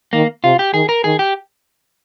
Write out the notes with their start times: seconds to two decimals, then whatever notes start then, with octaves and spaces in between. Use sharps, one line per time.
0.13 D#3 A#3
0.44 C3 F4
0.59 G4
0.74 D#3 G#4
0.89 A#4
1.04 D#3 G#4
1.19 G4